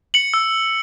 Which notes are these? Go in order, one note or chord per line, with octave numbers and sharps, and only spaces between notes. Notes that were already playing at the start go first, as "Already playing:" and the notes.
C#7 F#7
E6